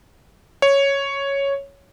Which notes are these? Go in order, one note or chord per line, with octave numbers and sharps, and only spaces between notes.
C#5